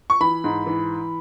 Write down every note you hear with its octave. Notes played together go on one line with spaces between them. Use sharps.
C#6
E3 B5
G#2
E3